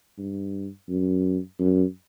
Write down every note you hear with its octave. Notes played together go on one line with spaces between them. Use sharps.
G2
F#2
F#2